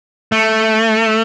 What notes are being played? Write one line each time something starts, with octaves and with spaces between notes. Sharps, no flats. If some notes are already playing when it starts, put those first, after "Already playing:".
A3